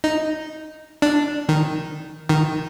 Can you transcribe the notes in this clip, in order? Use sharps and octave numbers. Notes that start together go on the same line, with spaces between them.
D#4
D4
D#3
D#3